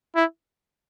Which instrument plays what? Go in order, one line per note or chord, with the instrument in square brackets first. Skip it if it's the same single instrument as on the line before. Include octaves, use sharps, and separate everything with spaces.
[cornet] E4